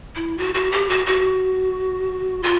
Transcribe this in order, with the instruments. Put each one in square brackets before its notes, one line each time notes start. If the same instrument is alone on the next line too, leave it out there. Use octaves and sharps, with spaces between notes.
[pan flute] E4
F#4
F#4
G4
F#4
F#4
F4